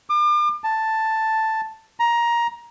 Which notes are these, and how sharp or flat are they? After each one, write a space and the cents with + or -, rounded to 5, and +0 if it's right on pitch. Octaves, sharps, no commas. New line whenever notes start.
D6 +40
A5 +5
A#5 +15